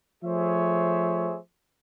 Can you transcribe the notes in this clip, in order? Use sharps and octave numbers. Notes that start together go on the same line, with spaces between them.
F3 A3 G#4 C5 C#5 E5